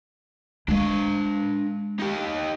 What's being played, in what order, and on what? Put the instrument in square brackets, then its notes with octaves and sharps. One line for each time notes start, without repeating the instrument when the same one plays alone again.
[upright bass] G#3 [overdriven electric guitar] D4 F5
[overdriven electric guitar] D#4 G4